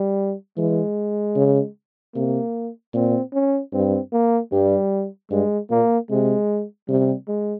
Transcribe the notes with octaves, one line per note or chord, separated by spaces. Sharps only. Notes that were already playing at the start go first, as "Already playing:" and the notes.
Already playing: G3
E3 G#3
C#3
C3 A#3
A#2 C4
C#4
G2 C4
A#3
G2 G3
G2 G#3
A#2 A#3
C3 G#3
C3 G3
G#3